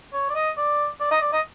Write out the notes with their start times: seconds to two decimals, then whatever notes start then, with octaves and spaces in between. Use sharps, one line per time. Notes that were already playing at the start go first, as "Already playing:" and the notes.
0.13 C#5
0.30 D5
0.35 D#5
0.57 D5
1.00 D5
1.11 D#5
1.22 D5
1.33 D#5